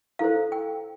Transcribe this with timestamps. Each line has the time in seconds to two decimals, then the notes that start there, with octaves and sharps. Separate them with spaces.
0.19 E4 A4 C5 F5
0.52 G5